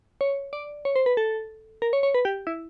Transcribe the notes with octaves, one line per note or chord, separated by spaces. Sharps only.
C#5
D5
C#5
C5
B4
A4
A#4
C#5
C#5
B4
G4
E4